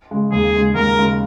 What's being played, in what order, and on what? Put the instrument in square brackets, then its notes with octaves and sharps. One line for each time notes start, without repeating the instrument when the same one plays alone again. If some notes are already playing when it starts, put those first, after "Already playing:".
[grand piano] C#3 G#3
[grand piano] D#2 [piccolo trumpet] G#4
[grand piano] C#3 G#3
[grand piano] D#2 [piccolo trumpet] A#4
[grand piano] C#3 G#3